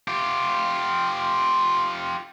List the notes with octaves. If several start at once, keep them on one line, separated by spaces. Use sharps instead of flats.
F4 G4